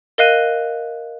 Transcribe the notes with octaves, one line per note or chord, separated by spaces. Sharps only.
A#4 D#5 F5 F#6 D#7